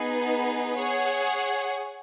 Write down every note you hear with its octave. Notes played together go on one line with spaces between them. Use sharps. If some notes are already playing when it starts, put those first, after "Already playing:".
Already playing: B3 D#4 G#4 B4
G#4 C#5 F#5